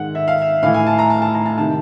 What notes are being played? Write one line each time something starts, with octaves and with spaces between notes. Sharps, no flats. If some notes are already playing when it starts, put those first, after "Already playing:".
Already playing: G#2 D#3 F#5
E5
F5
E5
A2 E3 F5
G#5
A5
A#5
A5
A5
A#5
A5
C3 D#3 A5